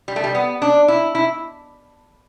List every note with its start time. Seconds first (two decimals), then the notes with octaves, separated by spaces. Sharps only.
0.08 G3
0.16 A3
0.24 G3
0.35 B3
0.62 D4
0.88 E4
1.15 E4